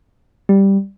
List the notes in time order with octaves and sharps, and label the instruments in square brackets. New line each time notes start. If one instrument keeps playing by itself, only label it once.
[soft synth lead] G3